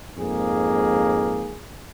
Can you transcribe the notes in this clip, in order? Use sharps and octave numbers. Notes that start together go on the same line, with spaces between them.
F2 G#2 A#3 G#4